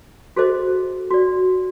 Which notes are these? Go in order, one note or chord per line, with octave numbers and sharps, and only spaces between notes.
F#4 G#4 A4 C5 D#5
F#4 D5